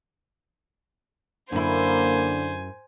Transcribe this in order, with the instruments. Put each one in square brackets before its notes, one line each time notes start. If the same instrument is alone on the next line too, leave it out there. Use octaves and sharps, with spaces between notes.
[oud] F#2 E4 [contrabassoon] D3 [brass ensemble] A#3 [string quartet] C5 G#5